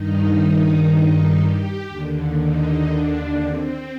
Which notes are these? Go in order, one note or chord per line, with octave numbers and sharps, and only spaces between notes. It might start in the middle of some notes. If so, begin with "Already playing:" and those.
Already playing: G2 D#3 D#4
G4
D#2 D3
D#4
D4
C4